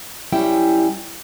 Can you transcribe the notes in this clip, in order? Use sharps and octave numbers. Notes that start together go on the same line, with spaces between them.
F#2 G3 C#4 E4 G5